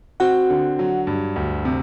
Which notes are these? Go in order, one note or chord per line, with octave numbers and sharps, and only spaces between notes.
C4 F#4 F#5
D3
F#3
G2
D2
C3